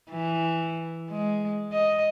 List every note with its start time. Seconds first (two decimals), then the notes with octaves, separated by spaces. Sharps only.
0.11 E3
1.09 G#3
1.73 D#5